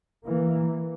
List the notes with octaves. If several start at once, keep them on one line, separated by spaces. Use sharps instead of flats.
E3 A#3